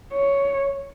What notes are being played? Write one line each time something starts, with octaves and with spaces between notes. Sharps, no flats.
C#5